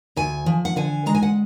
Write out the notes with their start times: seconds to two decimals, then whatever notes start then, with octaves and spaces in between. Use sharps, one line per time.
0.16 D2 G#5
0.46 F3
0.65 F#5
0.76 D3 G#5
1.06 G#3 A#5
1.15 G#5
1.23 F#5